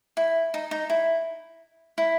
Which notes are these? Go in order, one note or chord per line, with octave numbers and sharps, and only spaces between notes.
E4
D#4
D#4
E4
E4